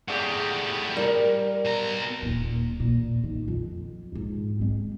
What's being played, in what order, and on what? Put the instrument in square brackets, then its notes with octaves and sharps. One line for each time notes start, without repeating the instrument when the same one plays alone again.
[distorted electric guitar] A2 G4 [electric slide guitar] G#4 D5 F#5
[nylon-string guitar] G3 [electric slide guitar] A#4
[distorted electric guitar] B2 A#5
[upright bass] D#1 A#2
A#2
D#3
F2
F2 G#2
G#3 C4